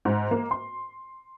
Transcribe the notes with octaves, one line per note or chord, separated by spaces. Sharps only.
G#2
A#3
C6